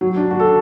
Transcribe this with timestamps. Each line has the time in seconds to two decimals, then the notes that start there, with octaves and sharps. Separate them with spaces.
0.01 F#3
0.16 D4
0.31 F#4
0.40 A4